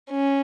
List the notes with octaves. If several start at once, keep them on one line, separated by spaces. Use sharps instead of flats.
C#4